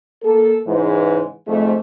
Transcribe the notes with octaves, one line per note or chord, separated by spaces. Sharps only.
A#3 A4
G#2 C#3 E3
F2 G#2 A3